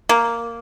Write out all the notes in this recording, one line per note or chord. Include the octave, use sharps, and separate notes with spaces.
A#3